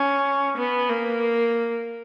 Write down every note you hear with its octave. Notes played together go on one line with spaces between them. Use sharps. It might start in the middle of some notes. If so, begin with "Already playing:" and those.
Already playing: C#4
B3
A#3